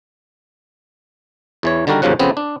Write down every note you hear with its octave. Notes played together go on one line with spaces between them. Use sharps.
E2 E3 C#5
D3 D#3 G3 F#4 A#4
D#2 G#2 C#3 F3 F#3 F#5
F2 C#3 B3 C4
D4